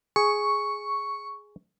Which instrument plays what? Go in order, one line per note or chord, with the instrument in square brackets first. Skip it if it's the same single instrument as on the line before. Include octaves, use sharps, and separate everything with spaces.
[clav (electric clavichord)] G#4 [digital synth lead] C#6